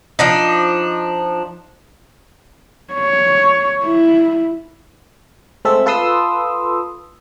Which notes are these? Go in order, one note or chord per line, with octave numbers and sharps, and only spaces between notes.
F3 D4 D#4
C#5
E4
G#3 A3 C4 A4 E5
F4 A4 B4 C6 D#6 E6